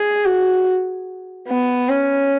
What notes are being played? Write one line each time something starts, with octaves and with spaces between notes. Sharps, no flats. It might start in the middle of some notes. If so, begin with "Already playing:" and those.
Already playing: G#4
F#4
B3
C#4